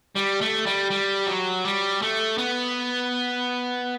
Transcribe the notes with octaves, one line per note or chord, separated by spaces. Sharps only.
G3
A3
G3
G3
F#3
G3
A3
B3